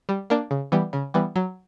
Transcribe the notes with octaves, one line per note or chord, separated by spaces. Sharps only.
G3
A#3 D4
C#3
E3 G3 B3
C#3
E3 G3 B3
F#3